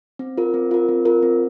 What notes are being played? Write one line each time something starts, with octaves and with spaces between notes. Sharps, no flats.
C4
F4 A#4
C4
F4 A#4
C4
F4 A#4
C4